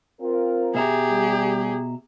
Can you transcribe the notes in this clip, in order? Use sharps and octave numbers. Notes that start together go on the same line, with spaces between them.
C4 F4 A#4
B2 G4 G#4 E5 A#5
G3